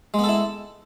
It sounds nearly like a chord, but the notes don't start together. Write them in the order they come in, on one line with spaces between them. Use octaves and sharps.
G#3 B3 A4 E4